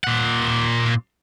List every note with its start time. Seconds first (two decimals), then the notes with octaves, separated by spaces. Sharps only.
0.04 A#2 F#5